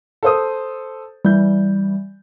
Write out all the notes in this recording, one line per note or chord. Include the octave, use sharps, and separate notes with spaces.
A4 C5 D#6
E3 G3 G6